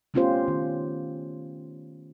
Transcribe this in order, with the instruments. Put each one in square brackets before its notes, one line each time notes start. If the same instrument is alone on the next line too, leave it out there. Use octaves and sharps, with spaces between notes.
[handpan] A3 B3 C#4 F4 G4 C5
D#3